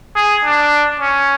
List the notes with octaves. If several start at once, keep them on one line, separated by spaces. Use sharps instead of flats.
G#4
D4
C#4